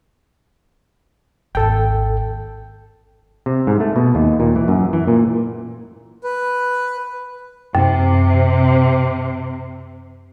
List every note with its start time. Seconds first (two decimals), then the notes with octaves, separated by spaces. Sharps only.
1.55 G#1 D#2 A4 G5
3.46 C3
3.67 G#2
3.80 A3
3.96 B2
4.15 D#2
4.40 A#2
4.56 E3
4.68 F#2
4.93 E3
5.07 A#2
6.24 B4
7.75 F#2 C3